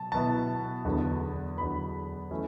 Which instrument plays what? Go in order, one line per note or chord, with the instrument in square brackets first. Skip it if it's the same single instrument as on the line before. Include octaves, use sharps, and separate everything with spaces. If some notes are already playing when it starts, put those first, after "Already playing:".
Already playing: [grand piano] B2 F#3 B3 A5
B2 F#3 B3 E4 A5
E2 D3 F#3 B3
E2 D3 F#3 B3 B5
E3 A3 C#4 E4